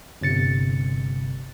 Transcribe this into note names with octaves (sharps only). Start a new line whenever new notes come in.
G1 C3 A6 C#7